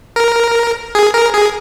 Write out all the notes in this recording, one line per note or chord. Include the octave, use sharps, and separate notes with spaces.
A#4
G#4
A#4
G#4